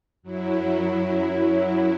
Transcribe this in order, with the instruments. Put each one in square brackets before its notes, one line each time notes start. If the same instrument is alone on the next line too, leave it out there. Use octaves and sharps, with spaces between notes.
[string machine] F#2 F#3 E4